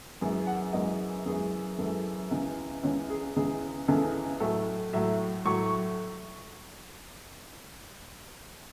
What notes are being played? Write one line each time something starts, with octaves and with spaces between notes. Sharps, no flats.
F#2 E3 G#3
F#5
F#2 E3 G#3 D#5
F#2 E3 G#3 G#4
F#2 E3 G#3 A4
C#2 C#3 E3
C#2 C#3 E3 C#5
G#4
C#2 C#3 E3 G#4
C#2 C#3 E3 A4
A2 F#3 A3 A4
A2 F#3 A3 E5
A2 F#3 A3 C#6